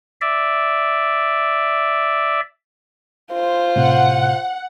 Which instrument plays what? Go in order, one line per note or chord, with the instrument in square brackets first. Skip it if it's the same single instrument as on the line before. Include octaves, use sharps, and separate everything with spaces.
[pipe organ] D5 E5
[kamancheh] F4 C5
[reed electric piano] A2 C3 [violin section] F#5